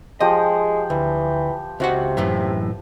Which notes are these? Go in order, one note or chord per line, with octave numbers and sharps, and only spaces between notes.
F3 G#3 G4 D#5
D2 E3
C#2 C3 F#4 F#5
F#2 A2 E3